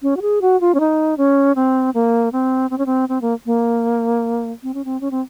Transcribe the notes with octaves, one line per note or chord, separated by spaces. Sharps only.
C#4
F#4
G#4
F#4
F4
C#4
D#4
C#4
C4
A#3
C4
C4
C#4
C4
C4
A#3
A#3
C4
C#4
C4
C#4
C4